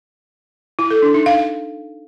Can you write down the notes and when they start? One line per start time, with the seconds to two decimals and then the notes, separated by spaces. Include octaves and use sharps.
0.79 E4
0.91 A4
1.02 D4
1.14 D#4
1.26 F5